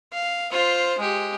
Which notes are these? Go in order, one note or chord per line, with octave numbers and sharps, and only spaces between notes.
F5
F4 C5
G#3 G4